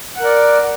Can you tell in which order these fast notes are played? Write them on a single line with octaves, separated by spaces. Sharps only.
F#5 A#4 D5